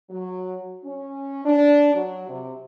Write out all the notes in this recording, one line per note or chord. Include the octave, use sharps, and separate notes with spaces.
F#3
C#4
D4
F#3
C3